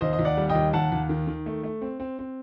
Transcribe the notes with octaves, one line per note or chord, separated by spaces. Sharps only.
D#2 C5 D#5
D#5
D#2
D5 F#5
G3
D#5 G5
D#2
D#2 F#5 A5
D#2
D#3
D#3
A3
A3
C4
C4
C4